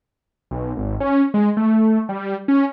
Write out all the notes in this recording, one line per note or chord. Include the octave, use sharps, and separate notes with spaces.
B1
G#1
C#4
G#3
A3
G3
C#4